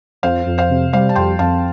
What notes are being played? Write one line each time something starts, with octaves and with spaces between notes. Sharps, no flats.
F2 C5 F5
F2
C5 F5
C3
G3 C5 F5
A5
F2 G5 C6
F2 F5 A5